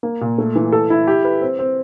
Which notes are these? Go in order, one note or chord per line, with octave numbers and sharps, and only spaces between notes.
A#3
A#2
A3
E3
A4
E4
G4
B4
C4
C4